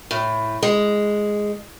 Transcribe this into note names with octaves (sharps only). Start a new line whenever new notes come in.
A2
G#3